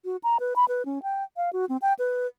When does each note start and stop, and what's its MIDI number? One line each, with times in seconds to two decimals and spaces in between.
0.05 0.17 66
0.23 0.37 82
0.40 0.54 71
0.56 0.65 83
0.68 0.85 71
0.85 1.02 61
1.03 1.23 79
1.37 1.50 77
1.53 1.65 66
1.69 1.77 60
1.82 1.93 79
1.99 2.27 71